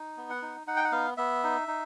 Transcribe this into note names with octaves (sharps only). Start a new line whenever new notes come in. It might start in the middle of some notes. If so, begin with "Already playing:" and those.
Already playing: D#4
B3
F#5
D#4
D#4 F#5
G5
F#5
B3 F5
B3 E5
D#4
D#4